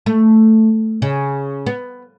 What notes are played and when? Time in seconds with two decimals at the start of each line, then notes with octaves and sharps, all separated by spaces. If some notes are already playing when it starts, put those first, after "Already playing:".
0.06 A3
1.02 C#3
1.66 B3